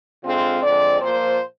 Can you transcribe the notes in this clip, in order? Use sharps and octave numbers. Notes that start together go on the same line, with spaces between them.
D3 G#3 C4 F4
D3 F3 G#3 C4 D5
A#2 F3 A#3 C5